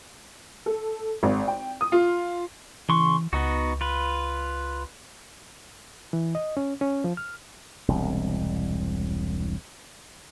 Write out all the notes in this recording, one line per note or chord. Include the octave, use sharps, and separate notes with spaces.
A4
G#1
G5
D#6
F4
C#3 E3 C6 C#6
C#2 B3 D#4 F#4
F4 B4
E3
D#5
C#4
C#4
F3
F6
E1 C2